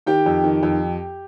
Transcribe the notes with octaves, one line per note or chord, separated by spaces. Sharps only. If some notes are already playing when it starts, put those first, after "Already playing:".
D#3 G4 G5
F2
D#3
F2